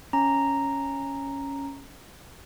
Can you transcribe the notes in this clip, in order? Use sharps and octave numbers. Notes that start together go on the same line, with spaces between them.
C#4 A#5